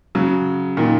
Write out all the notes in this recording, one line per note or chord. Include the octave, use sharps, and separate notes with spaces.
C#3 F#3
A#2 D#3